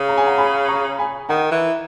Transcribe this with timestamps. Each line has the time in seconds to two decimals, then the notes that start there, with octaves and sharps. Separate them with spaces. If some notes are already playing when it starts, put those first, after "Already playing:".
Already playing: C#3
0.08 A#5
0.17 G#5
0.26 F#5 A#5
0.38 G#5 B5
0.68 A#5 C#6
0.98 G#5 B5
1.29 D#3 F#5 A#5
1.52 E3